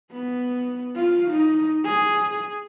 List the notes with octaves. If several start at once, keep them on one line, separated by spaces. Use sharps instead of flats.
B3
F4
D#4
G#4